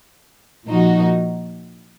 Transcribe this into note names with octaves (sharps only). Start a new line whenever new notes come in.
A#2 F3 A#3 D#4 F#4